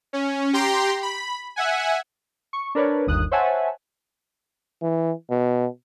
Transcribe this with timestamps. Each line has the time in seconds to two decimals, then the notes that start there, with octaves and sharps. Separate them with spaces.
0.13 C#4
0.53 G4 G5 A#5 C6
1.02 B5
1.56 E5 F#5 G#5
2.53 C#6
2.75 D4 A#4 B4 C#5 D5
3.07 G1 D#2 D#6 F#6
3.31 C5 C#5 E5 F#5 G#5 A5
4.82 E3
5.30 B2